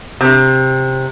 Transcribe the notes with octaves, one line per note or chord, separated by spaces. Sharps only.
C3